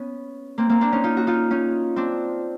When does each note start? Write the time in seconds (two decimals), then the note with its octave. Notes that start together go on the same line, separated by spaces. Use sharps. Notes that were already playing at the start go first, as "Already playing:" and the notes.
Already playing: B3 C#4
0.58 A#3 C4
0.69 A#3 C4
0.81 C4 D4
0.92 C#4 D#4
1.04 D#4 F4
1.17 F#4
1.27 D#4 F4
1.51 C#4 D#4
1.96 C4 D4